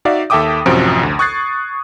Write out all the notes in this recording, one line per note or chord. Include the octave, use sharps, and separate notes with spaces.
D#4 F#4 D5 E5 F5
D#2 A4 E5 G5 D6 D#6
A1 F#2 C3 F3 F#4 D7
D2
C#6 D#6 F#6 G#6 A6 C7